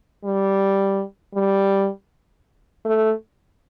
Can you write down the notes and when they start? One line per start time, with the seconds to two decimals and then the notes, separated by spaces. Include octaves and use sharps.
0.24 G3
1.35 G3
2.85 A3